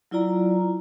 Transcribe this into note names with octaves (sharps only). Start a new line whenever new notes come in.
F#3 E4 F4 D5 A#5